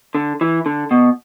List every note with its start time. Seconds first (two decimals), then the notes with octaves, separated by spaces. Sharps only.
0.15 D3
0.41 E3
0.66 D3
0.91 B2